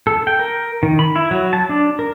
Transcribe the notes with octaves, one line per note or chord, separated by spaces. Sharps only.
A4
G5
A#4
D#3
B5
E4
F#3
A5
D4
A#4